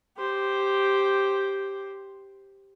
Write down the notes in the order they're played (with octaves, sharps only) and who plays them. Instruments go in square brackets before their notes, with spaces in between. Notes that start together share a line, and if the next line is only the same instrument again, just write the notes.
[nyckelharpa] G4 C5